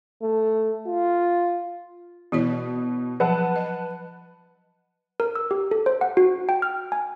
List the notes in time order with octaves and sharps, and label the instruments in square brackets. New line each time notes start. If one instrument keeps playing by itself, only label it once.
[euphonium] A3
F4
[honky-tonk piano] B2 [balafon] E3 E4 C#5
[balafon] F3 F#3 [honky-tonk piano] B4 F#5 A5
[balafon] D#5
[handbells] A#4
E6
G4
A4
C5
F#5
F#4
G5
F6
G#5